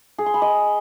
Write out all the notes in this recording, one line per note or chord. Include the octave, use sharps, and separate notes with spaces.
G#4
C6
B5
D#5